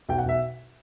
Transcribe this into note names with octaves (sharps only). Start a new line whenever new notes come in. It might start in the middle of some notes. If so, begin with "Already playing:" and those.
B1 G5
F#5
B1 E5